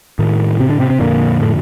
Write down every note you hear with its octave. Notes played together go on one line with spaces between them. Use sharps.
A2 D#3
C3 C4
D3 D4
C3 C4
C3 C4
F2 A#2 D3 A#3
A2 A3